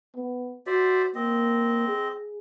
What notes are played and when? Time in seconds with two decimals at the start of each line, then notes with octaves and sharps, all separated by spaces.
0.16 B3
0.67 F#4 C5 D5 E5
1.15 A#3 C4 D#5
1.87 G#4